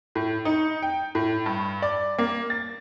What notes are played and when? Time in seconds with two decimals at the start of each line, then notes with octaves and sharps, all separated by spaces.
0.15 A2
0.45 D#4
0.82 G5
1.15 A2
1.46 G2
1.82 D5
2.19 A#3
2.50 A6